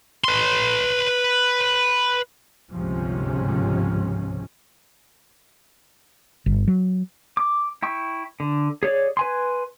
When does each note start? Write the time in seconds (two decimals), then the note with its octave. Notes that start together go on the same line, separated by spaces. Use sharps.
0.24 B4 C6
2.72 G1 C#2 G#2 C3 F3 C#4
6.46 G1
6.68 F#3
7.37 D6
7.82 E4 G5 C#6
8.40 D3
8.83 G#4 C#5 D5
9.17 B4 G#5 C6